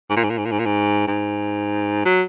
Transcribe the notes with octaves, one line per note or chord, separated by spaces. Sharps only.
G#2
A#2
G#2
A#2
G#2
A#2
G#2
A#2
G#2
G#2
F#3